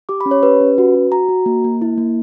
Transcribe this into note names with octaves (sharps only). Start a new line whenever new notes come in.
G4 D6
B5
C#4
C#5
G4 B4
C#4
F#4
F#4
F#4 A#5
F#4
A#3
A#3
E4
A#3